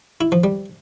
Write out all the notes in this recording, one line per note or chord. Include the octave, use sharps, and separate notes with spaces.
E4
F3
G3